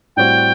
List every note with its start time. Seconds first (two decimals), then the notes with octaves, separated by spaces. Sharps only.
0.16 A2 G3 C4 F#4 G5